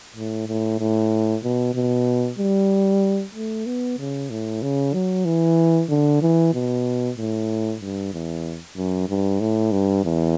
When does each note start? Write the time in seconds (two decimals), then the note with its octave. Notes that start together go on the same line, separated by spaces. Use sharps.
0.15 A2
0.47 A2
0.79 A2
1.43 B2
1.74 B2
2.39 G3
3.35 A3
3.66 B3
3.98 C#3
4.30 A2
4.62 C#3
4.93 F#3
5.25 E3
5.89 D3
6.22 E3
6.53 B2
7.17 A2
7.81 G2
8.13 E2
8.77 F#2
9.09 G2
9.41 A2
9.72 G2
10.04 E2